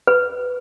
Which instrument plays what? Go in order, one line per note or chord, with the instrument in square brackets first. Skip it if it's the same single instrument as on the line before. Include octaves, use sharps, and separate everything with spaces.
[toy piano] B4